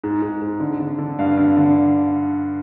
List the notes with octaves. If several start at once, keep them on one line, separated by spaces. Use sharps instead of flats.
G#2
G#2
G#2
D3
D3
D3
G2 F5
D3
D3